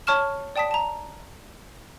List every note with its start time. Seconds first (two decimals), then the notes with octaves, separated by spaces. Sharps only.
0.07 C#5 A5 C#6 F6 E7
0.56 D5 G5 A5 D#6 B6
0.71 A5 A#5